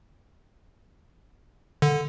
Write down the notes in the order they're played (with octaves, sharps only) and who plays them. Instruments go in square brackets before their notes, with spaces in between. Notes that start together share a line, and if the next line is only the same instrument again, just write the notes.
[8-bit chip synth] D3